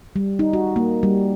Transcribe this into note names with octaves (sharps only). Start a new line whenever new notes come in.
G3
D#4
F#4
A#3
G3